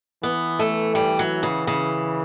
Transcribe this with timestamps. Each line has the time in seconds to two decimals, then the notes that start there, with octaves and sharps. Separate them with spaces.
0.23 E3 B3
0.59 A3
0.95 G3
1.19 F#3
1.43 C#3
1.67 C#3